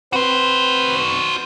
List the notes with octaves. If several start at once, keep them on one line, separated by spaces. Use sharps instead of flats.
C4 F#4 B4 C5